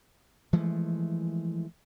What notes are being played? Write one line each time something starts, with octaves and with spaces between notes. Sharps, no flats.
E3 F3 G#3 A3